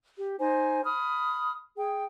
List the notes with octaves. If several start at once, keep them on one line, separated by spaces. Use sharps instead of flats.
G4
D#4 C5 G#5
B5 D#6 F6
G#4 G5